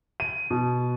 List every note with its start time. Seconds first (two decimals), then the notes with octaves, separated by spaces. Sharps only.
0.20 D#7
0.50 B2